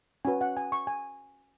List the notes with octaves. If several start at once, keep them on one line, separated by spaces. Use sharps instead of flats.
C#4 F#4 B4 G#5
F#5
G#5
C#6
G#5